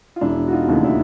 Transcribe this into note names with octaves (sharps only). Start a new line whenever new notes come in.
F4
E1 D4 E4
F#4
D#4 F4
D#2 C#3 E3 A3
D4 E4